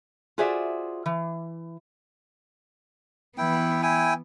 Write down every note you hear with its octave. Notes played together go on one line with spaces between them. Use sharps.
F4 F#4 G#4 C5 D5 E5
E3
E3 B3 E4 G5
E4 G5 G#5